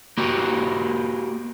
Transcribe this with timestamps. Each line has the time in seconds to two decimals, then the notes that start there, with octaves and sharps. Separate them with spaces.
0.18 A#3 F#4 G4 A#4